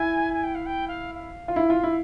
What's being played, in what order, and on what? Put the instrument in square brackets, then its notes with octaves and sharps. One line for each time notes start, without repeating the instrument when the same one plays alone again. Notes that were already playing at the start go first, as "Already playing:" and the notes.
Already playing: [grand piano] E4 [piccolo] G#5
[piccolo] G#5
G5
F5
G5
F5
F5
[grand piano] F4
E4
F4
E4